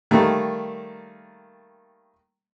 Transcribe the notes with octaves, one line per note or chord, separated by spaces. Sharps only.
D#3 G3 A3 A#3